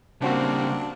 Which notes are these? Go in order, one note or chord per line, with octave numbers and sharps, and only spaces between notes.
C#3 G3 A#3 C4 D4 F#4